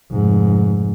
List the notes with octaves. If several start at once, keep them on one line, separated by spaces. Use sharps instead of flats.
F1 G#2